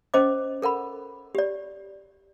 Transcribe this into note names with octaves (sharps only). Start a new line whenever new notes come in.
C#4 C5 D#5 D6
A4 A#4 F#5 B5
G4 D5